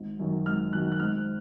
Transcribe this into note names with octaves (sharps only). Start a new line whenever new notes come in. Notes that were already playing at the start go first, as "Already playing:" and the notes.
Already playing: G#1
F#2 D#3 F#3
G#1 F6
F#2 D#3 F#3 F#6
F#6
G#2 F6